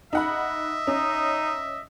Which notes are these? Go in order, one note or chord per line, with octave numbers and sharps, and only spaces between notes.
D#4 D#5 E5 F#5 B5
C#4 D#4